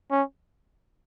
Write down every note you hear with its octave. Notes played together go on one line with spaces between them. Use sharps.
C#4